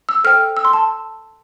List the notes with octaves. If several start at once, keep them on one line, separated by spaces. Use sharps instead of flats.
E6
A4 C5 G5 F6
E6
C6
A5